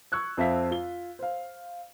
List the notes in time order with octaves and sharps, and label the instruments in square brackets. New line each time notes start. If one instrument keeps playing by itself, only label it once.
[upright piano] C#6 E6 F#6 G#6
F2 C4 E5 F5 B6
F4 G7
C5 F5